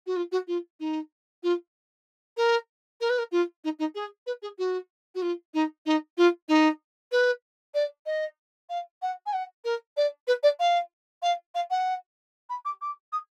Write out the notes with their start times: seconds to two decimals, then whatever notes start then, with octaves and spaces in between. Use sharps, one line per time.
0.06 F#4
0.16 F4
0.32 F#4
0.47 F4
0.80 D#4
1.43 F4
2.37 A#4
3.01 A#4
3.10 B4
3.18 A#4
3.32 F4
3.64 D#4
3.79 D#4
3.95 G#4
4.26 B4
4.42 G#4
4.58 F#4
5.15 F#4
5.22 F4
5.54 D#4
5.86 D#4
6.17 F4
6.48 D#4
7.12 B4
7.74 D5
8.06 D#5
8.69 F5
9.02 F#5
9.26 G#5
9.33 F#5
9.64 A#4
9.97 D5
10.27 B4
10.43 D5
10.59 F5
11.22 F5
11.55 F5
11.70 F#5
12.49 B5
12.65 D6
12.81 D6
13.12 D#6